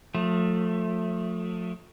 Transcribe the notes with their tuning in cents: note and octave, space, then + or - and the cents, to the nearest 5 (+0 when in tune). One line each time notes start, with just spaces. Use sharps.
F3 +40 A3 +10